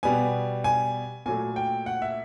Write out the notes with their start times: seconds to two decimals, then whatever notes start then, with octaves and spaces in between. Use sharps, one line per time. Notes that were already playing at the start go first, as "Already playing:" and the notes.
0.03 B2 G3 B3 G#5
0.64 G#5
1.26 A#2 F#3 A3 G#5
1.56 G5
1.86 F#5
2.02 E5